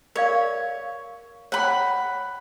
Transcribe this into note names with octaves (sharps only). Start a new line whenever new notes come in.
A#4 C#5 D5 F5
C#5 F#5 G5 B5